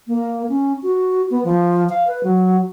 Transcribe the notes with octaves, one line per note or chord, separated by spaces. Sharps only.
A#3
C#4
F#4
B3
F3
F5
B4
F#3